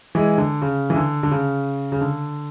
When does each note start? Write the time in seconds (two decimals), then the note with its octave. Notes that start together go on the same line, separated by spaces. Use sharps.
0.15 E3 G#3
0.38 D3
0.62 C#3
0.90 E3
0.96 D3
1.23 D3
1.31 C#3
1.92 C#3
2.01 D3